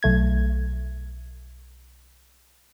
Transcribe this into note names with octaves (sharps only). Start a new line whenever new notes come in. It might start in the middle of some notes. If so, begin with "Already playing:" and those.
B1 A3 G#6